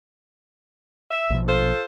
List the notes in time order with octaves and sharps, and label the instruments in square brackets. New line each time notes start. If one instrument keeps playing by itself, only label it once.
[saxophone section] E5
[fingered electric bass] A#1 B2 F3
[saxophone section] F4 A4 C5